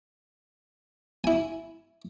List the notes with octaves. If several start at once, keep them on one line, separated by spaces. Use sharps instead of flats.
E4 G#5